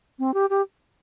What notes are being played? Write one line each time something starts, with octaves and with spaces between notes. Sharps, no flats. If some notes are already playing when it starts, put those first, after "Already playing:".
C4
G4
G4